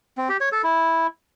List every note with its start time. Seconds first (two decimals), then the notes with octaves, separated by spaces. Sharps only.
0.18 C4
0.29 G4
0.41 C#5
0.52 A4
0.64 E4